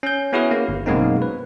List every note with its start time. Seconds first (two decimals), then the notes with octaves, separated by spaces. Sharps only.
0.03 C#4 G6
0.33 B3 C#4 E4 F#4 G#4 B4
0.51 A#3
0.69 G1
0.86 F#2 B2 G#3 A#3 C4 D#4
1.22 B4